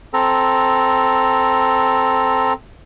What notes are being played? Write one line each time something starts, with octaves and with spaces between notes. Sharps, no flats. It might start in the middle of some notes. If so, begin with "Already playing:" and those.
C4 A4 A#5